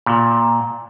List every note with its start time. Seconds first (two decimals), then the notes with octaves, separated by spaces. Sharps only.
0.06 A#2